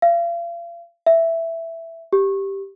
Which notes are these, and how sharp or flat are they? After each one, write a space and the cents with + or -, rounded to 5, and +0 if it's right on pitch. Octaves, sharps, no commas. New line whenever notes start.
F5 -40
E5 +5
G4 +0